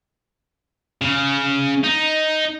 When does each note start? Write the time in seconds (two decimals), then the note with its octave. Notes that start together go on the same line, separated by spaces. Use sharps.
1.02 C#3
1.84 D#4